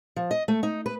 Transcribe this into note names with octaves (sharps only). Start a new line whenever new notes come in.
F3
D#5
A3
D#4
B4